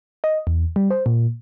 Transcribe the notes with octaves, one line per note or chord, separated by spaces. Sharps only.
D#5
E2
G3
C5
A#2